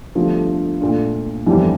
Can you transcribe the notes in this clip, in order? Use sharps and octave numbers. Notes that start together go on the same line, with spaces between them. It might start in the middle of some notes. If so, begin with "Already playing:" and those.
G1 G2 F3 A3
A#2 A3 D4 F4
G1 F2 E3 G3